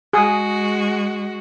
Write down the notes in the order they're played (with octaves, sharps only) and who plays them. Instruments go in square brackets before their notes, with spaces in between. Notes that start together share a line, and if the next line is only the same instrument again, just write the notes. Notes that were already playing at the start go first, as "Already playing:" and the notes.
[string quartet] G#3 F#4 [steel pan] G#4